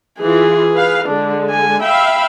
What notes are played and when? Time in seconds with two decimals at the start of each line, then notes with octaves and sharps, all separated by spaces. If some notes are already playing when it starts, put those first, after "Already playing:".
0.21 E3 F4 G#4
0.74 B4 F5
1.05 D3 G#3 D4
1.50 G#5
1.83 E5 F5 G5 B5